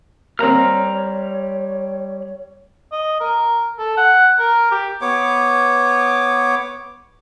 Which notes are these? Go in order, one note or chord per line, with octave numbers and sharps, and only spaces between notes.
G3 A#3 C4 C#5 A#5 F6
D#5
A#4
A4
F#5
A#4
G4
B3 C#5 D6